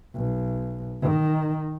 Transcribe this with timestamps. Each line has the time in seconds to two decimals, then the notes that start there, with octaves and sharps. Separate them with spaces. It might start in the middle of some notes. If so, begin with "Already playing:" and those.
0.14 B1
1.01 D#3